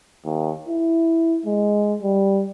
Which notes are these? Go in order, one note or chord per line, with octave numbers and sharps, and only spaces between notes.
D#2
E4
G#3
G3